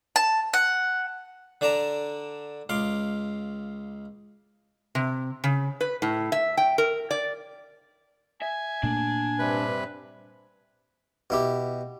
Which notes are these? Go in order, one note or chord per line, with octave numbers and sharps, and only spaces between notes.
A5
F#5
D3 D4 D5 A5 A#5
C#2 F5 C6 D6
C3
C#3
B4
A2
E5
G5
A#4
D5
E5 G#5
A#2 A3 A#3 D4
G2 C3 B4
B2 E4 G4